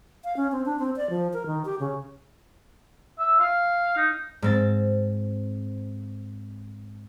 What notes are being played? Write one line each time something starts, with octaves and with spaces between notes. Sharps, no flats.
F5
C#4
C4
D4
C4
D5
F3
A#4
D#3
G4
C#3
E5
F5
D#4
G#2 C4 A6